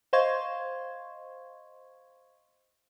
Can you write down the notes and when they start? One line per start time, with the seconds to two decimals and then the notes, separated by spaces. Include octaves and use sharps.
0.13 C5 D#5 F5 C6 C#6 G#6